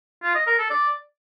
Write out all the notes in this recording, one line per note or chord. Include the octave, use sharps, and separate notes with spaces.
F4
D#5
A#4
A4
D5